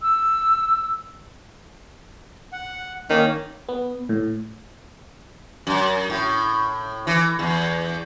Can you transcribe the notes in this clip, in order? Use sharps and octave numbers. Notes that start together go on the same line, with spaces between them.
E6
F#5
D#3 A#3 C#4
B3
A2
F#2
A2
E3
E2